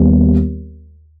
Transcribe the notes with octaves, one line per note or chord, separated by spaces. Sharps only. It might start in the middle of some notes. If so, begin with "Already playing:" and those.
Already playing: D#2 G3 B3